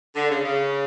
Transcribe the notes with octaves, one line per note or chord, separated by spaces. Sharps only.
D3
C#3
C#3